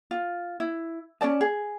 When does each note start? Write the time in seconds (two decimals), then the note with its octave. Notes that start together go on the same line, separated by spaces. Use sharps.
0.11 F4
0.60 E4
1.21 C#4 G#4 D5 A5
1.41 G#4